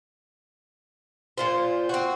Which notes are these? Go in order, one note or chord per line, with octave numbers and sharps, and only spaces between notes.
A#2 F4 C5
C4 F#4